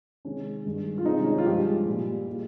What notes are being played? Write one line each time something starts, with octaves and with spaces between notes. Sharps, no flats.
C3 D#3 G#3 C#4
G2 D#3 G#3
F4
C3 D#3 G#3 D#4
C#4
D#4
F4
G2 F3 G#3 G4
A#2 G3
A#2 G#3